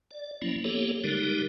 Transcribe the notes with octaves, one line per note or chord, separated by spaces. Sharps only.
D5
F3 F#3 A#3 C#4 E4
A#3 B3 G4 A4 C#5
D3 G3 G#3 D#4 G4 A#4